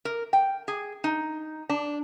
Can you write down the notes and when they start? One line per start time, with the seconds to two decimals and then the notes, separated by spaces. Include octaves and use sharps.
0.05 A#4
0.33 G5
0.68 G#4
1.04 D#4
1.69 D4